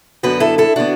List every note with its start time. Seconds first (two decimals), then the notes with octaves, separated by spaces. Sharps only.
0.23 F#2 D3 B3 F#4 B4
0.40 E4 A4
0.58 E4 A4
0.76 D3 B3 D4 F#4